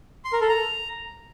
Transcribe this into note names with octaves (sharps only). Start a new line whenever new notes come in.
C6
A#4
A4
A#5